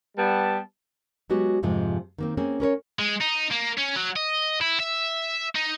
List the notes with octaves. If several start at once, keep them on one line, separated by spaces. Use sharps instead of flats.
G3 B3 A5
F#3 G#3 B3 F#4 G4
F2 G#2 C3 F3 G#3 C4
D#3 A#3 C4
A#3 C4 C#4 G#4
C#4 A#4 B4 C#5
G#3
D#4
A#3
C#4
F#3
D#5
E4
E5
D#4